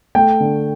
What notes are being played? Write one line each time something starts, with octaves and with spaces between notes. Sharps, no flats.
A3 G5
D3